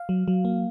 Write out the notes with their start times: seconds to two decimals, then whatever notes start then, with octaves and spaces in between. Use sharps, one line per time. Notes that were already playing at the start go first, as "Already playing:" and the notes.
Already playing: F5
0.09 F#3
0.28 F#3
0.45 A#3